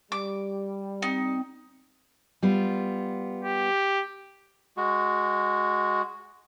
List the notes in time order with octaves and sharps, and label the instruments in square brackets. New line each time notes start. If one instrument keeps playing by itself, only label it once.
[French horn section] G3 [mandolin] D6
[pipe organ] C4 [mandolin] D#4
[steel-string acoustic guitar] G3 B3 F4
[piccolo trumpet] G4
[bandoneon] G#3 F#4